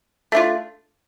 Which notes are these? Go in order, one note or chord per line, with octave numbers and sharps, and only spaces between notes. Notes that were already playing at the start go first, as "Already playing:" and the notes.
A3 D4 F4